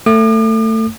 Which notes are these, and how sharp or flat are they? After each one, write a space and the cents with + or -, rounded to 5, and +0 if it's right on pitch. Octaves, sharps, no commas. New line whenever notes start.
A3 +20 D6 +45